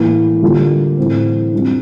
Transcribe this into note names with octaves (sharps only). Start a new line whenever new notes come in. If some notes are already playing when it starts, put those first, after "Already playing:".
Already playing: A2 E3 A#3
D3 G3 A#3 F4
A2 E3 G3 C4
F2 C3 G3 D4